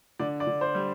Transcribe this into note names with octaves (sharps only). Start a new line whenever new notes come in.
D3 D5
D5
D3
C5
G3